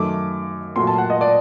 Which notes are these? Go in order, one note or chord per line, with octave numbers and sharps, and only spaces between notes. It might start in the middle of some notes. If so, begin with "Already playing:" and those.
Already playing: F#2 D#3 A3 D6
A#2 F#3 A3 C6
A5
F#5
D#5
D5